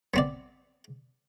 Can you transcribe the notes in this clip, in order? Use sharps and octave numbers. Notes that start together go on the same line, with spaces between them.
B3 C4 D5